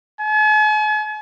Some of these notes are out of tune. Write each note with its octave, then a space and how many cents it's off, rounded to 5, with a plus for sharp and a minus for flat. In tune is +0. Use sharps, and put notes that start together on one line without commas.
G#5 +45